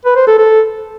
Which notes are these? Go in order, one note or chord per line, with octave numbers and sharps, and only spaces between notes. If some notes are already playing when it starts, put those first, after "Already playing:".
B4
C5
A4
A4